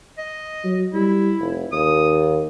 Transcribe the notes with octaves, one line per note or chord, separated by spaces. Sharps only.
D#5
F#3
G3 E4
F1
D#2 D#6